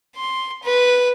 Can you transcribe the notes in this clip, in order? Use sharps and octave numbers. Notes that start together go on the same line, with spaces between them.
C6
B4